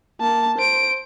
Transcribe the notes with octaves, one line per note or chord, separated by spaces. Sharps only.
A#3 A5
C5 D7